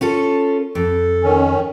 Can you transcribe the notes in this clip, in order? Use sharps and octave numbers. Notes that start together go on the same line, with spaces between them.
C#4 F4 A4
F2 A4
D#3 C#4